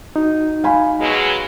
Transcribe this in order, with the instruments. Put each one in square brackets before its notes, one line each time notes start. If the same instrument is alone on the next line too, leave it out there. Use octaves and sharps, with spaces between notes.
[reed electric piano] D#4 F#4
[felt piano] F5 G#5 B5
[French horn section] B2 F#3 G#3